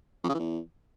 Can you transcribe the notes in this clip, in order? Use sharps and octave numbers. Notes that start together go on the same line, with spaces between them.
F2
C#3
E3
E2